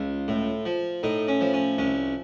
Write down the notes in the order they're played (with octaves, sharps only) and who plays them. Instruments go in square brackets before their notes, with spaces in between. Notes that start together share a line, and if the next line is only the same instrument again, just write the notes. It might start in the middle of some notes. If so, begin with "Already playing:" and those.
Already playing: [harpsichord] C#2 F4
A2
F3
A2 D#4
C#4
F3
C#4
C2 C#4